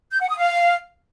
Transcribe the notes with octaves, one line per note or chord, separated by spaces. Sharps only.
G6
F#5
D#6
F5